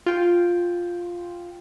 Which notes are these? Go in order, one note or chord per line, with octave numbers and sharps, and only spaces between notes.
F4 G5